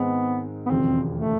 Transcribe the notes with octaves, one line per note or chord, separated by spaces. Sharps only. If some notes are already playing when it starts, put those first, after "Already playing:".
Already playing: G#2 D#3 G#3 B3 C4
B3
E1 D#2 C#3 F3 C4
A3